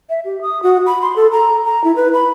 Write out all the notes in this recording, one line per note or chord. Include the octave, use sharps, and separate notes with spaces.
E5
G4
D#6
F#4
B5
C6
A4
A#5
A#5
E4
B4
B5